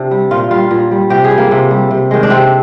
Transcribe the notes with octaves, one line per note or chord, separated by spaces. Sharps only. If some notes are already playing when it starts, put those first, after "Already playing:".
Already playing: C3 D4
G3
A#2 F4
G3 F4
A#2
G3
C3 G4
G#4
G3
A#3
C3
G3
C3
D#3 G#3
D4
C3 C4